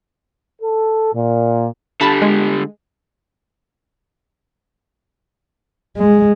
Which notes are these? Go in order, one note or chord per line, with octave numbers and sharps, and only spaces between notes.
A4
A#2
D3 G3 A5 B5
G#3
G#3